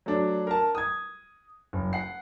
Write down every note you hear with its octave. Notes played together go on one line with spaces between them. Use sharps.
F#3 A3 D4
A#4 A5
D#6 G#6
F#1
F#5 C7